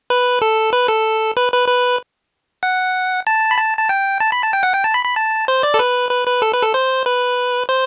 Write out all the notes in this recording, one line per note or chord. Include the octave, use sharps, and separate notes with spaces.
B4
A4
B4
A4
B4
B4
B4
F#5
A5
B5
A5
A5
G5
A5
B5
A5
G5
F#5
G5
A5
B5
B5
A5
C5
D5
A4
B4
B4
B4
A4
B4
A4
C5
B4
C5